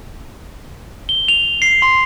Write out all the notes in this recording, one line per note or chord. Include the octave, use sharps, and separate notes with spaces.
G7
F7
C7
C6